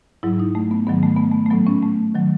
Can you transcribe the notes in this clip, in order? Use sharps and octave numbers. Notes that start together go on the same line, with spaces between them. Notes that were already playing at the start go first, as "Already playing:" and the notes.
G#2 F#3 E4
D#4
A3
B3
G#2 D#3 F#3 B3
A3
B3
A3
A3
A2 F#3 B3
C#4
A3
D#3 F#3